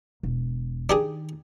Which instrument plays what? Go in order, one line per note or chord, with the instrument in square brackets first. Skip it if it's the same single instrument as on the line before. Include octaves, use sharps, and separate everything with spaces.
[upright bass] E1
[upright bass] D#3 [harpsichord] D4 G4 G#4